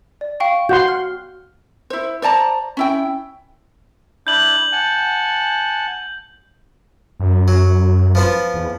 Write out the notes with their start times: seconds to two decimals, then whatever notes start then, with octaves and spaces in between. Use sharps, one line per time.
0.21 D5
0.40 F5 G5 C#6
0.69 F#4 F#5 C6 G6
0.88 F6
1.90 E4 C5
2.22 C5 D5 A5 A#5
2.77 C#4 E4 G5
4.27 D4 E4 G6 F#7
4.72 F#5 G#5 A5
7.19 F#2
7.48 F#3
8.15 F3 B3 F4
8.54 E2